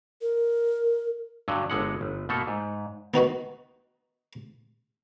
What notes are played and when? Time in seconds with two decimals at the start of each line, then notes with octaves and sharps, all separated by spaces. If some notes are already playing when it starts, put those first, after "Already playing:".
0.21 A#4
1.48 G2 D3 F#3
1.70 G1 D3 G#3 F#5
2.01 G1
2.29 B2 A3 A#3 A4
2.47 G#2
3.14 B3 D#4 F#4 B4